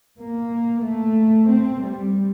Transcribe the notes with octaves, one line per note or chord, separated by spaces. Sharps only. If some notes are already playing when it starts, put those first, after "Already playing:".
A#3
A3
C4
G3